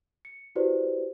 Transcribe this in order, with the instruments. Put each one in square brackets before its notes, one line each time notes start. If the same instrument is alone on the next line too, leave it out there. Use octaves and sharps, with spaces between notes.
[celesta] C#7
E4 F#4 G4 B4 C5 D5